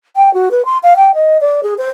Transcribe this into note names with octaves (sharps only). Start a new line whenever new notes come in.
G5
F#4
B4
C6
F5
G5
D#5
D5
G#4
C5